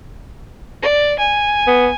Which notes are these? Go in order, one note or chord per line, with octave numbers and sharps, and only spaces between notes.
D5
G#5
B3